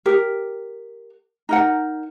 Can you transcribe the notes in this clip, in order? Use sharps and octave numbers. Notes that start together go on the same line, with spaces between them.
G4 A#4
D#4 A#4 F#5